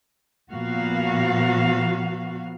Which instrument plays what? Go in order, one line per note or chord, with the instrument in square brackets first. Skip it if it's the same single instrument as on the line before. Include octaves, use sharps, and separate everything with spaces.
[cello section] A#2 F3 B3 F#4 F5